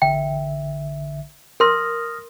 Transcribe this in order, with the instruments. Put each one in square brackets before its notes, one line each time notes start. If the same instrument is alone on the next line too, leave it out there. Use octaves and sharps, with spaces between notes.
[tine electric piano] A1 D3 E5 [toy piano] G5
[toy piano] A#4 C6 [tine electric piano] D#6 F6 A#6